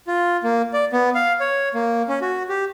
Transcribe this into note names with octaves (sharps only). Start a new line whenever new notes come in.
F4
A#3
D5
B3
F5
C#5
A#3
C#4
F#4
G4